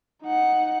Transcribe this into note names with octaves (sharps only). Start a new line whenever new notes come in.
D#4 F#5